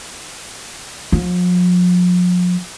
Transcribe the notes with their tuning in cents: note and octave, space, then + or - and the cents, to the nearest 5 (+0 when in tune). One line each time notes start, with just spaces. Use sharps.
F3 +45